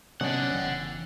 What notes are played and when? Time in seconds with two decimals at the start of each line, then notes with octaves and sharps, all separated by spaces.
0.21 C3 F#3 B3 C#4 D4 D5 D#5 F#5
0.55 F1 C#3 E3 G5